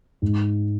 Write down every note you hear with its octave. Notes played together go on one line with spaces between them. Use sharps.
G#2